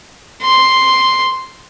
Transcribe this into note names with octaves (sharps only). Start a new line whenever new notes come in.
C6